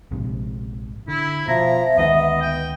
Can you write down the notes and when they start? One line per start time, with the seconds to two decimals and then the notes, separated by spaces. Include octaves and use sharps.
0.11 A#1 G#2 C3
1.08 D3 E4
1.48 B2 F3 E5 A#5
1.98 D2 D#3 G#3 B3 D#5
2.41 G5